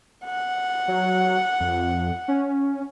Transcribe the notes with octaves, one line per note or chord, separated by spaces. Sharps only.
F#5
F#3
F2
C#4